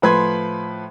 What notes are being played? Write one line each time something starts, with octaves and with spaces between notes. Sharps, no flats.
A2 F3 B4 B5 C6 G#6